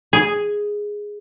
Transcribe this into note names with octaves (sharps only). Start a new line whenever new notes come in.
G#4